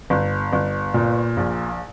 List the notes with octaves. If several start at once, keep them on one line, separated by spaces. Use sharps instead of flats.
G1
G1
A#2
A#1